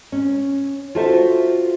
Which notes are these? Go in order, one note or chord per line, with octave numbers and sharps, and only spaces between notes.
C#4
F4 F#4 A4 C5 E5